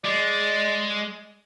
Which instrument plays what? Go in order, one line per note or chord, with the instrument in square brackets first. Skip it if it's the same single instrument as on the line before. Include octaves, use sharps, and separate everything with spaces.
[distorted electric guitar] G#3 [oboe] D5